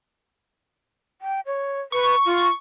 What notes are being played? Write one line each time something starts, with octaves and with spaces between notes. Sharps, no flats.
G5
C#5
B4 C#6
F4